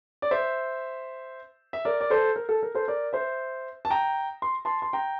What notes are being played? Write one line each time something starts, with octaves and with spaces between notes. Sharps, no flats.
D5
C5 E5
E5
A#4 D5
D5
A4 C5
A#4
A4
A#4
A4 C5
A#4 D5
C5 E5
A5
G5 A#5
C6
A5 C6
C6
G5 A#5